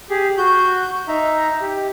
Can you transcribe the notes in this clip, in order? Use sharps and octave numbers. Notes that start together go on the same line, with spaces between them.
G4 G#4
F#4 G6
D#4 E5 A#5
G4